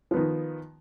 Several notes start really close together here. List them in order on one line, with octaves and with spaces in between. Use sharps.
F3 B3 D#3